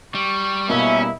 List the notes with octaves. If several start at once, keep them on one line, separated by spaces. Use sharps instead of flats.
G3 C#6
B2 G3 A#3 C#4 E4 E5